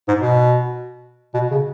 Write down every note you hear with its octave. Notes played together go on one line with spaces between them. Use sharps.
G#2
B2
B2
C#3